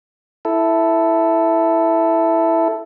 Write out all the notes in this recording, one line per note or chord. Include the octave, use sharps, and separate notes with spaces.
E4 A4